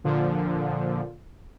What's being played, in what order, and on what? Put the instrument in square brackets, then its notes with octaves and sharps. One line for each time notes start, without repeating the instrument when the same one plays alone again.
[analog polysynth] A#2 D3 F3